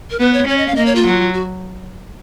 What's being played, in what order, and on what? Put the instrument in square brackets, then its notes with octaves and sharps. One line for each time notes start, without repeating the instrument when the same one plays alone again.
[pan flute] A#4
[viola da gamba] B3 [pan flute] B4
[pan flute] C#5
[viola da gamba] C#4 [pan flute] C#5
[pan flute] D#5
F5
[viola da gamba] A#3 [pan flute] D#5
[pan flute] C#5
F4
[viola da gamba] F#3
[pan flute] F#4